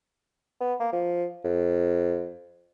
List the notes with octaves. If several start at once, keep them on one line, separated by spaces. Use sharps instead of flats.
B3
A#3
F3
F2